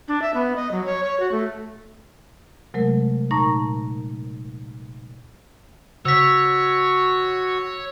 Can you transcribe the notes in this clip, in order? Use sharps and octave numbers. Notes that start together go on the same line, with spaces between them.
D4
E5
B3
D#5
F#3
C#5
C#5
F#4
A3
C3 F#3 G#3 A3 A#4
A#2 D#4 A5 A#5 C#6 A#6
C#3 F#4 C#5 E6 B6